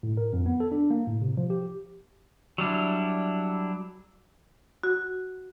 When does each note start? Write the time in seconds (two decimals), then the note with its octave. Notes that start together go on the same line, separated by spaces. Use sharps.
0.03 A2
0.17 A#4
0.33 F2
0.46 B3
0.60 A4
0.72 D4
0.90 A#3
1.07 A2
1.22 C3
1.37 F3
1.50 G4
2.58 F#3 G3 D4 E4
4.83 F#4